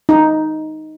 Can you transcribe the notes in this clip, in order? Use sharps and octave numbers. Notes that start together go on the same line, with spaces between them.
D#4